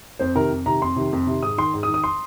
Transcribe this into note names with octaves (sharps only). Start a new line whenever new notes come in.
F2 C5
C3 D#3 A#4
F2
C3 D#3 A#5
F2 C6
C3 D#3
F2
C3 D#3
G#2 D#6
D#3 C6
G#2
D#6
D#3
D#6
C6